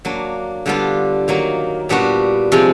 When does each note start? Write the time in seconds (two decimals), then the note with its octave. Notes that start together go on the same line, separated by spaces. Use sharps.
0.05 F#3 A#3 D4
0.66 D3 G3 B3 D4 F4
1.28 D#3 F#3 A#3
1.89 A#2 G3 B3 D4 F#4
2.52 C3 F3 G#3 C4